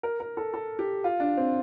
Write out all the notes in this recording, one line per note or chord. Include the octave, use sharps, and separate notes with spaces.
A#4
A#4
A4
A4
G4
F4
D4
C4